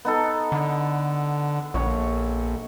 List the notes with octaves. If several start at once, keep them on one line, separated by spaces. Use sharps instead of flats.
B3 D#4 A4
D3
A#1 C#5